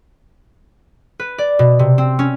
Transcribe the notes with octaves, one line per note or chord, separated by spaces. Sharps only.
B4
D5
B2
C3
C4
C#4